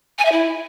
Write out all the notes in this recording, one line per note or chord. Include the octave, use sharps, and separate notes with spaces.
G#5
E5
E4